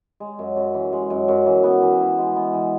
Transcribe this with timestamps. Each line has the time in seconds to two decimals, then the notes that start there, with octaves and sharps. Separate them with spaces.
0.20 G#3
0.39 F#2
0.57 F#2
0.74 E3
0.93 G#3
1.10 F#2
1.28 F#2
1.46 E3
1.64 B3
1.82 E3
2.00 E4
2.18 G#3
2.36 B3
2.54 E3